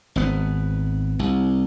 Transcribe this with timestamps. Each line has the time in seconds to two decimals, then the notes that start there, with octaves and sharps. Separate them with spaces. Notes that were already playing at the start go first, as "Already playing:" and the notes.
0.16 G#1 B3
1.19 C2